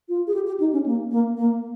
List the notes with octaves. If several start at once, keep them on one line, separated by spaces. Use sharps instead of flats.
F4
G#4
G4
G4
D#4
C#4
A#3
A#3
A#3